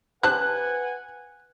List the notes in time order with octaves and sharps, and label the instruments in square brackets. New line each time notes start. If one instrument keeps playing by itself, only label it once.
[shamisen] G4 C5 A5 [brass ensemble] B4 F#5 G#5 [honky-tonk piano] F#6